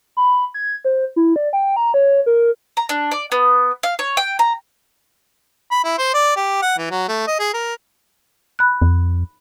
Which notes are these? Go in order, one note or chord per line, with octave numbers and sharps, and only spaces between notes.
B5
G#6
C5
E4
D5
G5
A#5
C#5
A#4
A#5
D4
D5
B3
F5
C#5
G5
A#5
B5
E4
C5
D5
G4
F#5
E3
F#3
A3
D#5
G#4
A#4
B5 F#6
F2